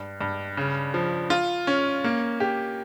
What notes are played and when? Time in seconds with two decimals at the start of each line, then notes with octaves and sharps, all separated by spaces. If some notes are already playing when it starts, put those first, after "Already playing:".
Already playing: G2
0.21 G2
0.57 C#3
0.94 F3
1.30 F4
1.67 C#4
2.04 A#3
2.40 G4